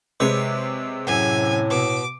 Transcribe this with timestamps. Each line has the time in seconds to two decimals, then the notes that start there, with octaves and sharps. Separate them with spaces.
0.20 C3 G#3 B4 C#5
1.07 F#2 A2 G#5
1.70 B2 D6